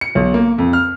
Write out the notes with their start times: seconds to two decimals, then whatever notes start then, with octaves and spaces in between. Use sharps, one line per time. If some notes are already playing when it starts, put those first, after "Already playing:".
0.01 C#7
0.15 B1
0.34 A#3
0.58 F2
0.73 F6